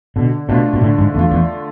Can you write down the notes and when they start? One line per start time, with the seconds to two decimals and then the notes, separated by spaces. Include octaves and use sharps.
0.16 B2 D3
0.49 B2 A3 D4 F4
0.73 B2
0.81 A2 D3
0.98 G#2
1.14 E2 A3 D4 F4
1.31 E2